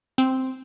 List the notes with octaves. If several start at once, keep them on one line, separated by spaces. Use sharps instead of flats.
C4